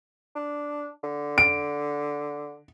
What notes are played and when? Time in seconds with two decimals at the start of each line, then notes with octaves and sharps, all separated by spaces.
0.35 D4
1.03 D3
1.38 D7